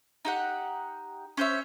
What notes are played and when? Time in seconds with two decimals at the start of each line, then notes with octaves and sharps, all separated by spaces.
0.25 D#4 G4 F#5
1.37 C#4 C5 C#5 E5